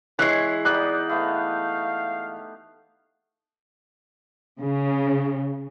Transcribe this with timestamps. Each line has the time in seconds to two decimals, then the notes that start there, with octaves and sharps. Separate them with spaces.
0.19 E3 G#3 C#5 F#6 C7
0.65 B3 D#4 G4 D5 F#6
1.09 A3 B3 F5
4.59 C#3